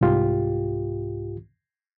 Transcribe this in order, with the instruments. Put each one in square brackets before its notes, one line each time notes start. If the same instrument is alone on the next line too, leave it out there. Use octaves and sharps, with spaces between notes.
[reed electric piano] C2 G#2 F4 G4